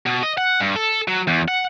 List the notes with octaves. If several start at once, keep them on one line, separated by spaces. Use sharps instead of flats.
B2
D#5
F#5
G2
A4
F#3
E2
F#5